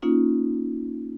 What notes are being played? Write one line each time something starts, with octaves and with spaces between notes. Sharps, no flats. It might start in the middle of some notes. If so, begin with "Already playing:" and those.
A#3 C#4 D#4 F4